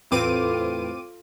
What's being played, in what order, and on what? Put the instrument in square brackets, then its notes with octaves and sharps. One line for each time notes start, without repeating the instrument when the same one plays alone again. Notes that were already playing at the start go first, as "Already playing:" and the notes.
[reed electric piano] E2 B4 C5 [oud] A2 [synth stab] C4 D6 D#7 [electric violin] F4